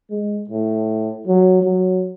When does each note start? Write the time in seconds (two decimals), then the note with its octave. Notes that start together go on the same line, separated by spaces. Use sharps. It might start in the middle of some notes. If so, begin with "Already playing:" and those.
0.10 G#3
0.50 A2
1.27 F#3
1.63 F#3